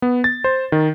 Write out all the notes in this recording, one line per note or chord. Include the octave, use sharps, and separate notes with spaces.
B3
A6
C5
D#3